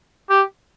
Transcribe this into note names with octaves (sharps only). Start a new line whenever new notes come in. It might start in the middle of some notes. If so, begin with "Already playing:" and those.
G4